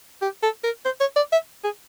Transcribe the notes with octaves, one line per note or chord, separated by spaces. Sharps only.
G4
A4
A#4
C5
C#5
D5
E5
G#4